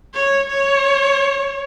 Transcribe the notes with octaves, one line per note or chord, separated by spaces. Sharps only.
C#5
C#5